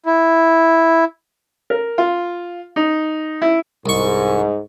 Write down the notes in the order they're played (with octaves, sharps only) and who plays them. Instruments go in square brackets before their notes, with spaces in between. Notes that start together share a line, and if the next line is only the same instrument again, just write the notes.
[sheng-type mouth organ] E4
[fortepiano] A#4
F4
D#4
E4
[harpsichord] C2 C#6 [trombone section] G#2